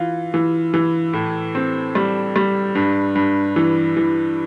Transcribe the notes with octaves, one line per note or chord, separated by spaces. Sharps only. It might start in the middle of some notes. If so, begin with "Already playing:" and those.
Already playing: E3 F4
E3
E3
A2
C4
G3
G3
G2
G2
E3
E3